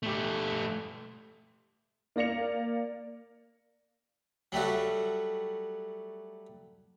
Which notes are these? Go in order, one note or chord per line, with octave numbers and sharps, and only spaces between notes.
A3 G4
A#3 D5 A#6 C#7 F7
F#3 G3 A3 F#4